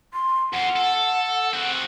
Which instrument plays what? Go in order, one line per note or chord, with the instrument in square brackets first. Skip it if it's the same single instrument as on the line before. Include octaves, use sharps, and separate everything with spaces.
[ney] C6
[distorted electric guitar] F2 F4 [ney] F#5
[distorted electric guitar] A4
C4 F#4